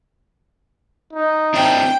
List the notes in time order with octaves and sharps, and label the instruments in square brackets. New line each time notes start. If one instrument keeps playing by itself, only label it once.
[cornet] D#4
[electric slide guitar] C4 D4 E4 [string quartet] G5